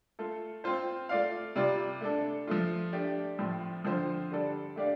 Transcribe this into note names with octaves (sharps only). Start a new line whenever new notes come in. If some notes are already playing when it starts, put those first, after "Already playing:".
A3 F4 A4
C4 F4 C5
A3 F4 D5 F5
C3 G3 F4 D5
A3 D4 A4
F3 A3 F4
A3 D4 G4 D5
A2 F3 C4
D3 F3 C4 F4 C5
D3 G3 D4 A4 D5
A3 D4 G4 D5 F5